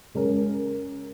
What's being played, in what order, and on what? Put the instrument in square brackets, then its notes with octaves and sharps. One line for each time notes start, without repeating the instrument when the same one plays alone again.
[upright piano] C#3 G#3 C#4 A#4